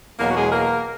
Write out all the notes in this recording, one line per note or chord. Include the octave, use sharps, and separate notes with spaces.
E2 B2 F#3 A#3 A#4
F#4
G#3 G#4
A#3 A#4